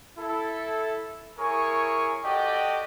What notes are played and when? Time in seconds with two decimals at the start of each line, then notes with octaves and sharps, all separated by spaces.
0.18 E4 A4
1.39 E4 G#4 A#4 C#5 G#5 C#6
2.24 F#4 G4 A4 D5 D#5 G5